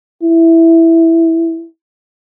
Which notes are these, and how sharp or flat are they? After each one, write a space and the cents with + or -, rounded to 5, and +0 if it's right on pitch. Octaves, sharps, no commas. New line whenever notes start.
E4 +0